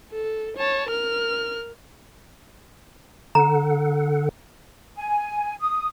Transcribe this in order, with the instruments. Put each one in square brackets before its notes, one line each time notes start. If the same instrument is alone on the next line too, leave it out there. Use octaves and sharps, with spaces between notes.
[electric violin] A4
C#5 A5
A#4 F6
[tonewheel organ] D3 A4 F#5 [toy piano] A#5
[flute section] G#5
D#6